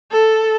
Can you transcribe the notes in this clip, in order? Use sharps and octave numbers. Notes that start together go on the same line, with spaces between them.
A4